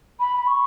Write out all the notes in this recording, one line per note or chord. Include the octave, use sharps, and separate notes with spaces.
B5
B5
C#6